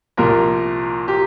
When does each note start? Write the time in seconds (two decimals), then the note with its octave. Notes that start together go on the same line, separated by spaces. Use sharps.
0.17 C2 A#2 F3 A#4
1.08 G4